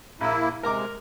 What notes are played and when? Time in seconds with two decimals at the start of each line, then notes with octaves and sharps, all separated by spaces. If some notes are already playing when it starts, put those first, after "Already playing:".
0.21 A#1 A#3 E4 E6
0.63 C3 G#3 A#4 A#5 D6